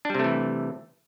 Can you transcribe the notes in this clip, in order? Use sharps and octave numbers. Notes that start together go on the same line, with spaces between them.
C3 E3 G3 A3 D4